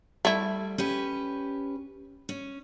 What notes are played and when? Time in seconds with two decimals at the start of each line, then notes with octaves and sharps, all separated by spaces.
0.25 G3 A3 E4
0.78 C#4 G4 B4
2.29 C#4